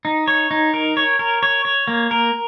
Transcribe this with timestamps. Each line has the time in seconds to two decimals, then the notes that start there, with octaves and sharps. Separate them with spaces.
0.05 D#4
0.28 C#5
0.51 D#4
0.74 A#4
0.97 C#5
1.19 A#4
1.43 C#5
1.65 C#5
1.88 A#3
2.11 A#4